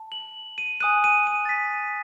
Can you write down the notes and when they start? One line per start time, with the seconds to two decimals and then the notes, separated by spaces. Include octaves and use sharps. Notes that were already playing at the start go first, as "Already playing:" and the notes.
Already playing: A5
0.12 F#7
0.58 D#7
0.80 G#5 D#6 F#6 D#7
1.04 D#7
1.27 D#7
1.45 A6
1.49 B6